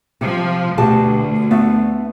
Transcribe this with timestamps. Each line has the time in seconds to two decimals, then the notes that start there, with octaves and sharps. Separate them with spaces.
0.21 C3 F3
0.78 D2 B2 G4 A5
1.51 A3 B3